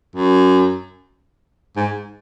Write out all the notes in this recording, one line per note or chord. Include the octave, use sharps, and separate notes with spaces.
F#2
G#2